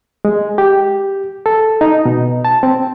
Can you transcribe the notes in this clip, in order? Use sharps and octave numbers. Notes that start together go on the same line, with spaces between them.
G#3
G4
A4
D#4
B2
A5
C4